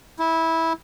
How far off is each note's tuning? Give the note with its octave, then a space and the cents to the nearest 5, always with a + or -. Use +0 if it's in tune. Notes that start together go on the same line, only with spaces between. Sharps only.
E4 -15